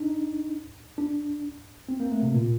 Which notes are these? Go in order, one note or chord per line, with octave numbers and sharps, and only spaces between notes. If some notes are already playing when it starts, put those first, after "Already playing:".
Already playing: D4 D#4
D4
C4
A#3
A3
C3
A#2